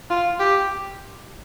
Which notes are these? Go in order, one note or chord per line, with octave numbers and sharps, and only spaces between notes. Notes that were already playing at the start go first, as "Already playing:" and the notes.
F4
G4